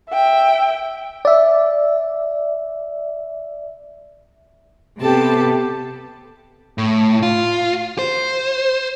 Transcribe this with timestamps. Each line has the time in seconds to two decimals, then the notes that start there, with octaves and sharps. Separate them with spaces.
0.10 E5 G5
1.25 D5 E5
5.01 C3 B3 G4 A4 A5
6.78 A2
7.23 F4
7.98 C5